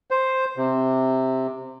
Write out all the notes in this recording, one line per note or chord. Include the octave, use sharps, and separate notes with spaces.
C5
C3